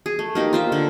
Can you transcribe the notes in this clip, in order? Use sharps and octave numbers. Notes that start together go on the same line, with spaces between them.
G#4
A3
A#3 D#4 G4
F4 C5 E5
D3